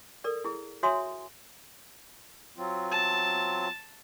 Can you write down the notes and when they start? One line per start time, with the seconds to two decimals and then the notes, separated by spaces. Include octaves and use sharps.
0.24 A4 A#4 D5
0.44 E4 G#4
0.83 F#4 C#5 E5 G#5 C6 D#6
2.57 F#3 C4 F4
2.91 A5